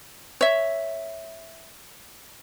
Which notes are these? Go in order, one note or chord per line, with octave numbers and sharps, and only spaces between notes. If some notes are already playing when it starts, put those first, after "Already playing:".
C#5 E5